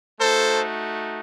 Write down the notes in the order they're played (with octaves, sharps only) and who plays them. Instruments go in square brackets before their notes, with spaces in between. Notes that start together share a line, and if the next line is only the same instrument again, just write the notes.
[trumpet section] A3 D#4 F#4 A4 C5